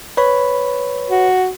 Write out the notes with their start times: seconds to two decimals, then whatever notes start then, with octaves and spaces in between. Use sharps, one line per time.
0.17 B4 C#5 B5
1.10 F#4